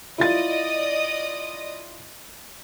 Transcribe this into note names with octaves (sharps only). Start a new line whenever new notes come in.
E4 F4 D5 D#5 D#6 A6